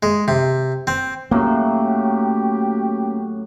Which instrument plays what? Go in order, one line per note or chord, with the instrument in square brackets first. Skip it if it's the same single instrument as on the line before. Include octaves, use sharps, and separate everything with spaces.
[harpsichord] G#3
C3
C4
[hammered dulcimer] A2 F#3 [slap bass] A#3 C#4 [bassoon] G4